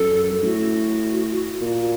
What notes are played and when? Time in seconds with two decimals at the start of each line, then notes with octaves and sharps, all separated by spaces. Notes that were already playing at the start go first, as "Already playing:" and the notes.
Already playing: F#2 A4
0.32 F#2
0.44 A2 F#4
1.62 A#2